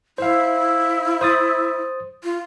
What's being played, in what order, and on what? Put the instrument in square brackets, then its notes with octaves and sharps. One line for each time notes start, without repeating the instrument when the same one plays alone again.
[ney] E4 [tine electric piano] C5 F5
[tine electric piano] C5 D#6 A6
[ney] F4